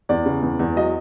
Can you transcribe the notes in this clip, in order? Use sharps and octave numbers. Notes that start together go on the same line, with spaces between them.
E2 D5
C#3
E2
E2
F#3 D#5